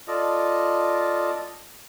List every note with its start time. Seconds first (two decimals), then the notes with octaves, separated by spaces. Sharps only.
0.08 F4 A4 D5 D#5